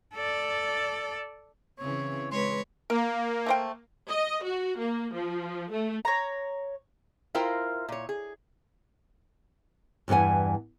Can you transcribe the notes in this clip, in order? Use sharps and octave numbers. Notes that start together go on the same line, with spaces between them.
A4 D5
C#3 E3 C4 C#4 C#5
G#3 B4 C#5 C6
A#3 A#4
A3 C5 G5
D#5
F#4
A#3
F3
A3
C#5 A#5
E4 F4 A#4 C5 F5 G5
A#2 C#5
G#4
E2 G2 E3 F#5 G#5